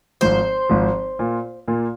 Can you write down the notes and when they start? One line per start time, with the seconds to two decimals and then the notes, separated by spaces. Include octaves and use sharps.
0.21 G#1 G#2 F3 C5
0.69 G#1 G#2 F3
1.19 A#2 A#3 F4
1.68 A#2 A#3 F4